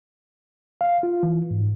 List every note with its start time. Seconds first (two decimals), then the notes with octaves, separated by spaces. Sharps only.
0.81 F5
1.03 F4
1.23 E3
1.51 G#2